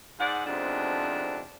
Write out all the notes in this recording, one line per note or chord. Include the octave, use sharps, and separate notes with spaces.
G#2 G#4 D5 F#5
F2 G#2 C3 B3 D4